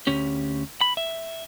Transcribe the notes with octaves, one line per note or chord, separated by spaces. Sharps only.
D2 C#4 G4
B5
E5